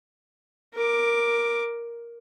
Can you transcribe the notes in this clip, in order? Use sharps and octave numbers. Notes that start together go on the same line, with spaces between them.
A#4 D6